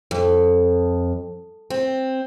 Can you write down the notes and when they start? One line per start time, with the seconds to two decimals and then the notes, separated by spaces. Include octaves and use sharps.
0.11 F2
1.70 C4